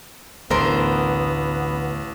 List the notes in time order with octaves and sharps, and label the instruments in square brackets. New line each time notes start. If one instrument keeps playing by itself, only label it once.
[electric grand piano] A1 [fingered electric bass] D2 [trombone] B3 [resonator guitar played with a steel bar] A#4 C5